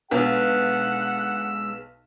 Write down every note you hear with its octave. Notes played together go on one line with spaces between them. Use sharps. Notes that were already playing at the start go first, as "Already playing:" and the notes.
B1 G#3 B3 D4 B4 F#5 E6